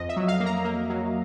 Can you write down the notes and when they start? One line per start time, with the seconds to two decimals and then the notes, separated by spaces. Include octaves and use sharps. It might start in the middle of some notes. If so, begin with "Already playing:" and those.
Already playing: F2 D#5
0.09 E5
0.16 F#3
0.28 F5
0.40 A#3
0.46 A#5
0.65 A#3
0.90 F#3